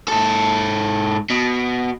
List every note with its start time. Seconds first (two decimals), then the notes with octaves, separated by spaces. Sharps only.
0.08 G#2 A4
1.30 B2